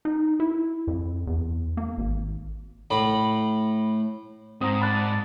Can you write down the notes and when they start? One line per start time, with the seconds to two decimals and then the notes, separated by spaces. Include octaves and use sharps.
0.05 D#4
0.40 E4
0.87 F2
1.27 E2
1.77 A#3
1.98 G#1
2.90 A2 B5
4.61 G#2 C4 A#5 D#6
4.81 D5 A5 B5 F#6